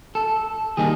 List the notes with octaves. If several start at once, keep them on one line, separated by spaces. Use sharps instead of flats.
A4
D#3 G3 A#3 D#4 G#4